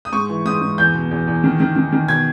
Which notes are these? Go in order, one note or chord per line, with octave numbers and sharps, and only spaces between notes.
D#6
G#2 C#6
E3
G#2 D#6
G#2
E2 G6
B2
E2
E2
D#3
D#3
D#3
D#3
B2 G#6